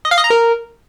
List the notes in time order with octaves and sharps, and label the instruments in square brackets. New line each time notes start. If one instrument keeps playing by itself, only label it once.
[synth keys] D#5
F5
D#5
A#5
A#4